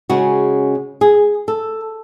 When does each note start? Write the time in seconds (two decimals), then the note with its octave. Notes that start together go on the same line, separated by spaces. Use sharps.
0.09 C#3 G#3 C#4 F#4
1.01 G#4
1.48 A4